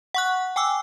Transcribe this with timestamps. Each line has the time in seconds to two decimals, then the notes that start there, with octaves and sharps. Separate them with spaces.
0.14 F#5 C#6 F#6
0.56 G5 G#5 D6 E6